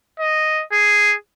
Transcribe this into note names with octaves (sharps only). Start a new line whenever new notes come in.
D#5
G#4